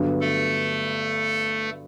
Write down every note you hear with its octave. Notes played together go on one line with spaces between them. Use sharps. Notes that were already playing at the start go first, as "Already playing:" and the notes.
Already playing: G2 D3 F#3 B3
A3 A4